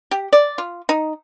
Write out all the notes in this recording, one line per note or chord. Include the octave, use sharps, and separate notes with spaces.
G4
D5
F4
D#4